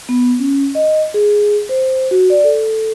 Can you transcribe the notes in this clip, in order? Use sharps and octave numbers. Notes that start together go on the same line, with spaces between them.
B3
C#4
D#5
G#4
C5
F#4
D5
A4